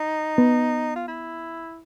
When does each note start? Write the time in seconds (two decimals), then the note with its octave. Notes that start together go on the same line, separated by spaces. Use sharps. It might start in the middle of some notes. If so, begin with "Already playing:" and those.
Already playing: D#4
0.38 B3
0.96 F4
1.08 E4